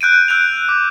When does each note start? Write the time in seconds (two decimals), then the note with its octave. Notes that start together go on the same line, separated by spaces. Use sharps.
0.01 F#6 G6 D7 D#7
0.28 E6 F#6 G6 D7 F7
0.69 D6